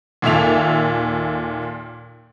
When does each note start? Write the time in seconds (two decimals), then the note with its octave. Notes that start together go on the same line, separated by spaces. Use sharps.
0.22 D#2 A#2 A4 E5 F7